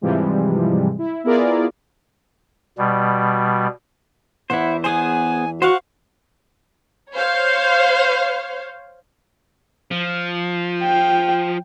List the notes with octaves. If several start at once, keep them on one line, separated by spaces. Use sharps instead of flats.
G#2 C3 E3 F3 G3 G#3
E4
B3 E4 F4 G#4 A#4 D5
B2 G3
E2 E3 E4 C5 F#5
B3 G#4 C5 G#5
F#4 C5 F5 F#5 C#6
C5 C#5 F5
F3
G5